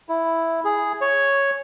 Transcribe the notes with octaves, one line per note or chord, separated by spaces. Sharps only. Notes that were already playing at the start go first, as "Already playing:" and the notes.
E4
G#4
C#5